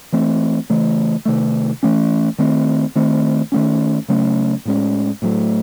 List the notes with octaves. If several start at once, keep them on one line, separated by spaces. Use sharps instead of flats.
E3 A3 C4
C#3 E3 A3
C3 D#3 A3
E3 A3 C#4
D#3 A3 C4
D#3 A3 C4
D#3 A3 C#4
C#3 F#3 A3 C#4
A2 G#3 C#4
A2 F#3 A3